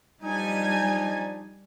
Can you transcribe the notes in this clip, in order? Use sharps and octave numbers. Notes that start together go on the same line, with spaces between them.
F3 G3 D4 D#4 G#5